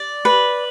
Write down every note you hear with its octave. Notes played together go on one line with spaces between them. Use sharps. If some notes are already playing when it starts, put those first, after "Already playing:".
Already playing: D5
B4